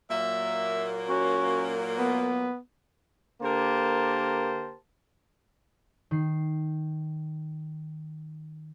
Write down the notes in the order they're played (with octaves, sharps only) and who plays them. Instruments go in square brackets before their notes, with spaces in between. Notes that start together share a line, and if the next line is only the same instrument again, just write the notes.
[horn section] A#2 F#3 A#3 [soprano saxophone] E5
[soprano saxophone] C#4 [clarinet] F#4
[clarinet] B3 [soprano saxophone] B4
[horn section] D3 A#3 G4 A#4 C5 A5
[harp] D#3 C7